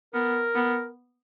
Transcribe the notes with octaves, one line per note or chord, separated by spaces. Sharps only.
B3 A#4
B3